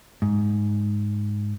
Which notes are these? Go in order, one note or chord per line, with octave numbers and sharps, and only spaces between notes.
G#2